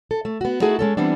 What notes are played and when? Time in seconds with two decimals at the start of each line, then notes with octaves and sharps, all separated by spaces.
0.11 A4
0.25 A3
0.41 B3 F#4
0.60 A3 D#4 E4 F#4 G#4 A4
0.79 G#3 C#4 A4
0.97 E3 G3 B3 C4 D4